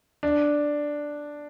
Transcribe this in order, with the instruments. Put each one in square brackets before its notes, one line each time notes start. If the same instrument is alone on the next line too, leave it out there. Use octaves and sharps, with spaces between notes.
[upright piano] D4